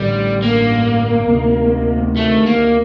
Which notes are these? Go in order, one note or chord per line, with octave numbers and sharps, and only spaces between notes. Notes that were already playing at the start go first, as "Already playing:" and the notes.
Already playing: A1 G2 D3 G3
A#3
D2 C3 D#3
A3
A#3